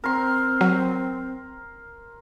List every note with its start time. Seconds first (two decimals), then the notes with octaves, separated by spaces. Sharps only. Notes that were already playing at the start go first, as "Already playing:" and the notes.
0.04 C4 A#4 C6
0.61 F#3